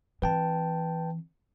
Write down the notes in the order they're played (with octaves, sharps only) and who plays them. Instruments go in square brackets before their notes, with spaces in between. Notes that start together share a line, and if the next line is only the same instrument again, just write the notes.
[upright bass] E3 C4 [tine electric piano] B4 G5 A5